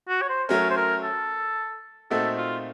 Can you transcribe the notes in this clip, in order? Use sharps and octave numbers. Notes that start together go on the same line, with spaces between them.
F#4
C#5
C5
F#3 A3 C#4 A#4
C5
A#4
A4
A#2 A3 C4 D#4 F#4 A4
F4